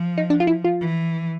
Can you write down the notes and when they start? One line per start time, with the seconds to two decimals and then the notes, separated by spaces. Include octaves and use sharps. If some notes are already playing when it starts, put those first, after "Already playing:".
Already playing: F3
0.18 D#4
0.30 D4
0.40 F4
0.47 E4
0.64 F4
0.81 E3